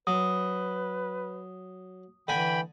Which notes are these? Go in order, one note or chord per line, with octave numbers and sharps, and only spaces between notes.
F#3 B4 D#6
D3 E3 G5 G#5 B5